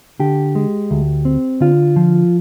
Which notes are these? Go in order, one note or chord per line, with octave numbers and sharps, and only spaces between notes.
D3 G4
G#3
D2
C4
D3 F4
F3